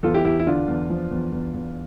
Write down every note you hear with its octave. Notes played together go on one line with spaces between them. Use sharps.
E2 F4 A4
E4 G4
E2 E4 G4
E4
D3 D4 F4
E2
F3
E2
E2
E2